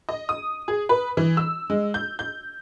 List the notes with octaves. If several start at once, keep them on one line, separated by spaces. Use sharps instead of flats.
D#5
D#6
G#4
B4
E3
E6
G#3
G6
G6